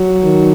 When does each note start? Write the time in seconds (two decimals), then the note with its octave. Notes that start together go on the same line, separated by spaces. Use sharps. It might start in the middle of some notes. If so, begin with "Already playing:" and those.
Already playing: F#3
0.24 D#3